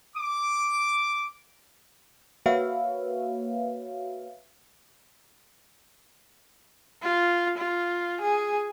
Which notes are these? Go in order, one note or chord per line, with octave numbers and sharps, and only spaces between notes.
D6
A#3 F#4 B4 C#5 E5 F5
F4
F4
G#4